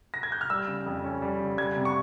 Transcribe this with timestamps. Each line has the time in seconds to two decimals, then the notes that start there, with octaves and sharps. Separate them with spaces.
0.14 A#6
0.23 G#6
0.32 G6
0.41 F6
0.50 G3 E6
0.68 C#3
0.86 F2
1.04 C#4
1.22 G3
1.40 C#3
1.58 G3 G#6
1.76 C3
1.85 C#6